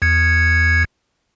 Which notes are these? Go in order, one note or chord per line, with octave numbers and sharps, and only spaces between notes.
E2 G#6 C#7